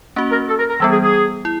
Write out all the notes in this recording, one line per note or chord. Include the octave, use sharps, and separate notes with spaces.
A#3 C#4 F#4
A#4
A4
A#4
A#4
E3 G3 B3 A4
G#4
G#4
E4